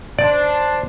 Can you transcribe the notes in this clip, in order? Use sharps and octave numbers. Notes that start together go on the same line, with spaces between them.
D4 C5 D5